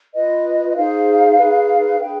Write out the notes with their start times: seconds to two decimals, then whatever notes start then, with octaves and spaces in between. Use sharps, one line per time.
0.14 F4 B4 D#5
0.69 D#5
0.76 D#4 G#4 C5 F5
1.38 D#4 G#4 B4
1.99 D4 G#4 B4 G5